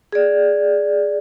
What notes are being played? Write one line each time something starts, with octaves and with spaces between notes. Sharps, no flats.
G#4 D5